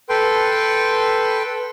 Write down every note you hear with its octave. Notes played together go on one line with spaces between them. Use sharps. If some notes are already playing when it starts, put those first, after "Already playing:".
A4 B4 G5 C6